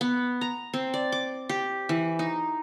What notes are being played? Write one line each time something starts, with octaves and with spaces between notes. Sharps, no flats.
B3
A#5
C4
D5
D6
G4
E3
D#4